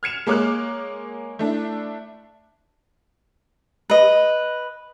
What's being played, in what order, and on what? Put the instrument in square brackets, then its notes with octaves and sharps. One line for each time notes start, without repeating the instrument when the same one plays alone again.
[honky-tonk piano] F6 G#6 C#7 E7 F7
G#3 A#3 C#5 D6 F6 F#6
A3 D4 E4
[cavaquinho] B4 D#5